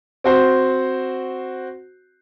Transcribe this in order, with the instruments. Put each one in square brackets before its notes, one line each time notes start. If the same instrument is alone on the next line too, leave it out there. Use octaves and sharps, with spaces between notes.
[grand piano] C4 F#4 C5